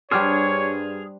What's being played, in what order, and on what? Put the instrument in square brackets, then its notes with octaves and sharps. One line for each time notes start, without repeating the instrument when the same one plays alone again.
[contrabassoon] G2 [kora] G3 D4 C5 [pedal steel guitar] G#4 F6 [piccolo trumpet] C#5